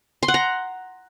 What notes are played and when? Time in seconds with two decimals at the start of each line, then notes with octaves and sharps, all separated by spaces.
0.23 C6
0.28 F#5
0.34 A#5